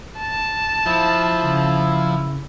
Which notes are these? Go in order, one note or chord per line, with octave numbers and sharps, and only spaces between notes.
A5
F3 E4
C#3